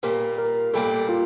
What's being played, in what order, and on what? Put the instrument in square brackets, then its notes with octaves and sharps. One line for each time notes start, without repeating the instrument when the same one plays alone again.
[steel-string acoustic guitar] A#2 G3 A#3 [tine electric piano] A#4
[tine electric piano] A#4
[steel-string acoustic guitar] A#2 G3 A#3 [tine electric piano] A4
[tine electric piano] F4